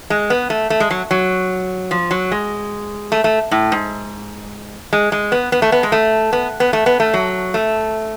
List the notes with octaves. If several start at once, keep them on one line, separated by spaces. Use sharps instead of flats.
G#3
B3
A3
A3
G#3
F#3
F#3
F3
F#3
G#3
A3
A3
A2
G#2
G#3
G#3
B3
B3
A3
B3
G#3
A3
B3
B3
A3
B3
A3
F#3
A3